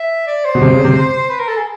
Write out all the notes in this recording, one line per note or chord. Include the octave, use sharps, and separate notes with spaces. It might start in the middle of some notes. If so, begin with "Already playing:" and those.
Already playing: E5
D5
C5
B2
C3
C#3
C3
B4
A#4
A4
G#4